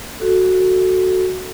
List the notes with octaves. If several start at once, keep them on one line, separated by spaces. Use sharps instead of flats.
F#4 A4